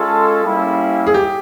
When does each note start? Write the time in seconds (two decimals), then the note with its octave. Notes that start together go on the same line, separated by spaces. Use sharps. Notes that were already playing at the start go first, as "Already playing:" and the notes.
Already playing: G#3 C#4 F4 G#4 A4
0.43 G3 A#3 C#4 E4
1.07 G#4
1.14 G4